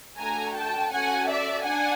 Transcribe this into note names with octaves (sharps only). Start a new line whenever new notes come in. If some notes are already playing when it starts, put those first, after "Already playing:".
A3 D4 F#4 A4 G#5 A#5
G5 A5
C#4 F#4 A4 F#5 G#5
D5 E5
D4 F#5 G#5